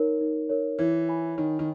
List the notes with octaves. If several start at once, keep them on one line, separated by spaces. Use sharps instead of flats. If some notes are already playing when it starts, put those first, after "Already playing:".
Already playing: D#4 A#4 C#5
D#4
A#4 C#5
E3 C#5
G#5 B5
D#3 C#5
D#3